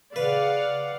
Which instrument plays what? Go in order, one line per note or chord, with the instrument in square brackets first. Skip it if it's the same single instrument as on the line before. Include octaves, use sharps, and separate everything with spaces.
[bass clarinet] C#3 [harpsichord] B4 [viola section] D5 F5 F#5